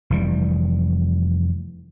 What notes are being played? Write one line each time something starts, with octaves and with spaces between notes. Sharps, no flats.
F1 E3 G3